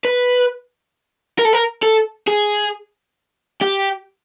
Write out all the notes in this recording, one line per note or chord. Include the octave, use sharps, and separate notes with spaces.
B4
A#4
A4
A#4
A4
G#4
G4